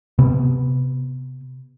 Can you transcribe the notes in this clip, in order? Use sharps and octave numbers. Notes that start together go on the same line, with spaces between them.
C3 B3